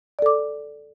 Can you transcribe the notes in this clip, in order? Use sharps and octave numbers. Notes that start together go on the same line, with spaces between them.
A4 D5 D6